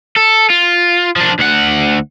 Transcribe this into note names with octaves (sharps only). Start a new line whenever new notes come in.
A4
F4
F3 D4
D2 F#5